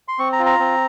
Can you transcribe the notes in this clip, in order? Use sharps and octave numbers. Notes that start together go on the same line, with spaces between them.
C6
C4 C#6
A#5
F4
A#5
C4